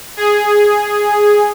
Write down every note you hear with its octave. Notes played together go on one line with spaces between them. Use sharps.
G#4